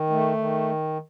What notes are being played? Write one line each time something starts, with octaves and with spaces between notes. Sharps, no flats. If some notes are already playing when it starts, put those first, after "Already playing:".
Already playing: D#3
A3
D#3